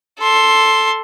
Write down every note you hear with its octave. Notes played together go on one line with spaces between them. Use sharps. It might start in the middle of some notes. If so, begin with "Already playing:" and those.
A4 C6